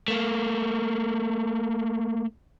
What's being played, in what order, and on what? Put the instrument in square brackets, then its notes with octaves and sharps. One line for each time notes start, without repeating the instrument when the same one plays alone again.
[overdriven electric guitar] A3 A#3